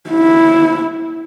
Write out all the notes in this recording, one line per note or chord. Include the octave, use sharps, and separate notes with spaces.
E4